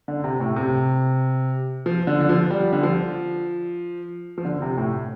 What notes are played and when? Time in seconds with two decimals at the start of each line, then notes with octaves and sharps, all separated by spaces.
0.08 D3
0.24 C3
0.40 A2
0.56 C3
1.86 F3
2.07 D3
2.20 D3
2.29 F3
2.50 G3
2.73 D3
2.83 F3
4.38 F3
4.45 D3
4.62 C3
4.78 A2